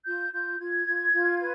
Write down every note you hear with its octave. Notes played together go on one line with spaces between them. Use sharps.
F4 G6
F4 G6
F4 G#6
F4
F4
B4